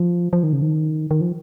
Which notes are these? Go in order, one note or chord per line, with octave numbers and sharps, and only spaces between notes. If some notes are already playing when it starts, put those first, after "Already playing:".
Already playing: F3
F3
D#3
C#3
D#3
D#3
F3